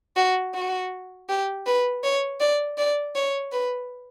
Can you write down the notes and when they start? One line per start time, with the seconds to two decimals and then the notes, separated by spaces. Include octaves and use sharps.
0.16 F#4
0.55 F#4
1.29 G4
1.66 B4
2.03 C#5
2.40 D5
2.78 D5
3.15 C#5
3.52 B4